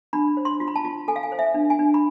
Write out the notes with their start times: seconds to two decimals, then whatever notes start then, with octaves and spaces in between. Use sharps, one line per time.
0.13 D4 B5
0.37 C5
0.45 C6
0.60 F4
0.68 B5
0.76 A5
0.85 F4
1.08 A4 G#5
1.16 F5
1.23 G#5
1.32 C5
1.39 E5
1.54 D4
1.70 G#5
1.79 D4
1.94 B5